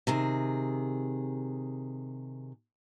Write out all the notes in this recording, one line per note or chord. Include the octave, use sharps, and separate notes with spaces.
C3 D#3 G#4